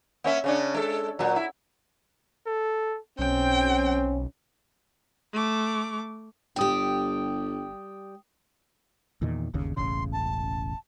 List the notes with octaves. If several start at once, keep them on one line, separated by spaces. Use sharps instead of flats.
A#3 C#4 E5
C#3 C#4 D4
G#3 A4
A#2 F#3
E4
A4
B1 C4 C#4 G5
A3 D6
G1 G3 G4 G5 D#6
E2 A#2 D#3
G1 D#2 C#3
E1 A1 C#3 C6
A5